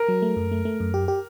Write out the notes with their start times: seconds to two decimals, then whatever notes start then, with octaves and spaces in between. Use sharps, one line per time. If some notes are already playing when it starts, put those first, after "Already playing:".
Already playing: A#4
0.08 F#3
0.22 A3
0.37 F#2
0.52 A3
0.65 A3
0.80 F#2
0.94 G4
1.08 G4